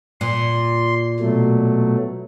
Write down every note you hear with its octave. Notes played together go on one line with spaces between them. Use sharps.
A#2 C6
B2 F#3 A3